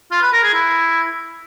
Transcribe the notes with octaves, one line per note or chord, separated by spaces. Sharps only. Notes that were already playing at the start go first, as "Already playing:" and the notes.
F4
B4
A#4
G#4
E4